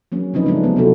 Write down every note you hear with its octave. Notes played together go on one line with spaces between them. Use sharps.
F#3 A#3 C#4 D4
C#3 F3 C4 C#4 D#4 B4
G#3 A3 C4 D4 D#4
F#3 B3
C3 D4 E4 F#4 A4